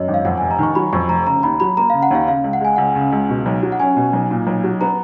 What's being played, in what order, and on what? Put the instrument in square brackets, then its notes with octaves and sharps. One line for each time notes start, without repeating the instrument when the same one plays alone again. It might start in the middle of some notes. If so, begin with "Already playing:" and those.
Already playing: [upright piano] F#2 [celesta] C#5 D#5
[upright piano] G#1
[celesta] F5
[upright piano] F2 [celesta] F#5
[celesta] G#5
[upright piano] F1
[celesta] A#5
[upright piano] D#3 [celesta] C#6
[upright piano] F#3 [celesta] B5
[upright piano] F2 [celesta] C#6
[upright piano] F1 [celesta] A#5
[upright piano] C#3 [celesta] A#5
[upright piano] D#2 [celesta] B5
[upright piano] F#3 [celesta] B5
[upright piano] A#3 [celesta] A#5
[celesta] F5
[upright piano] C#3
[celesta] F#5
[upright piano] D#2 [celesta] F5
[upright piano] C#3 [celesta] F5
[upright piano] C#2
[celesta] F#5
[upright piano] G#3 [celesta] G#5
[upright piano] C#2 [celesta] F#5
[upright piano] C#3
C#2
B2
B1
F#3
[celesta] F#5
[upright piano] C#4 [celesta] G#5
[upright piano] B2
B1
A#2
B1
F#3
[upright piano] B3 [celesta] A#5